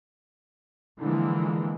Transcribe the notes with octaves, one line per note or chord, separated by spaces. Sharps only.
D3 E3 F3 G#3 A#3